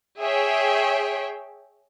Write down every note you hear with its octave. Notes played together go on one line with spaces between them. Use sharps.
G#4 C#5 E5 G5